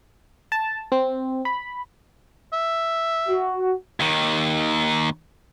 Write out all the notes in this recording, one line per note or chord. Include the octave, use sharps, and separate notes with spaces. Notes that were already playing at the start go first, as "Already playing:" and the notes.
A5
C4
B5
E5
F#4
D#2 D#3